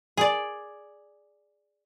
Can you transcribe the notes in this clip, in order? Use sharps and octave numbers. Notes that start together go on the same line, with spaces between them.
G#4 D5